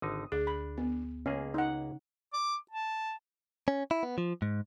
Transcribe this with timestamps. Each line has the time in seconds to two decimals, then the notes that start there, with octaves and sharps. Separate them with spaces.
0.02 G#1 D3 D#4 D#6
0.32 D2 D4 G#4
0.47 B5
0.78 B3
1.26 C#2 C#3 A#3 C#4 G#4
1.54 D#4 F#5
2.33 D6
2.71 A5
3.68 C#4
3.91 E4
4.03 B3
4.18 F3
4.42 G#2